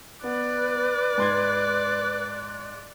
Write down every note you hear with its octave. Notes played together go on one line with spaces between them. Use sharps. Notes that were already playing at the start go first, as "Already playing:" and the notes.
B3 B4 D5 F#6
G#2 C6 G#6